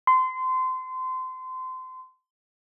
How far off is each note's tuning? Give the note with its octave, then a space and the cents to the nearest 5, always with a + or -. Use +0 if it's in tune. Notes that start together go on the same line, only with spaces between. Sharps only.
C6 -25